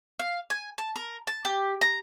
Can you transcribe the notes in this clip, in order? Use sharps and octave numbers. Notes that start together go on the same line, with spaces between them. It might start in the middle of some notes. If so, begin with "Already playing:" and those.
F5
G#5
A5
A#4
A5
G4
A#5